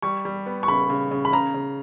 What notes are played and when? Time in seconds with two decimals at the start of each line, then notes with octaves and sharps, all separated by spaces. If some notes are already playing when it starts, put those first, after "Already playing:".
0.02 G3 C#6
0.25 G3
0.46 B3
0.63 C#6
0.68 C#3 B5
0.90 C#3
1.11 C#3
1.25 B5
1.33 C#3 A#5
1.54 C#3